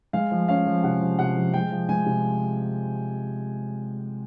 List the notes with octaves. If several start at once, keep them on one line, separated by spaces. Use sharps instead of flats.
G#3 F5
F3
C#4 F5
F3
C3 F#5
F3
C3 F#5
F3
G#3 G5
F3
G#3 G#5
C3